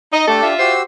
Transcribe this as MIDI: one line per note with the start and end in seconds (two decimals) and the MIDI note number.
0.13 0.25 63
0.13 0.24 75
0.27 0.39 57
0.27 0.53 62
0.27 0.53 67
0.27 0.47 69
0.42 0.72 65
0.42 0.72 76
0.59 0.82 66
0.59 0.82 67
0.59 0.81 72
0.59 0.82 88